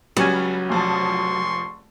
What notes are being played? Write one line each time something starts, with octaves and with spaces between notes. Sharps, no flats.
C#2 F#3 G3 C#4 G#5
F1 F3 A5 C6 C#6